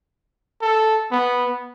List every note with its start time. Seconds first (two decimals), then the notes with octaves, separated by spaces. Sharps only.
0.62 A4
1.11 B3